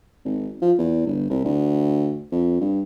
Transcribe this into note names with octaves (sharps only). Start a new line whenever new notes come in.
G#1
F3
E2
G1
C2
D2
F2
G2